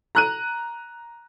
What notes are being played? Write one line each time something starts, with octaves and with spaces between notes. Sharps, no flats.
A#5 F#6 D#7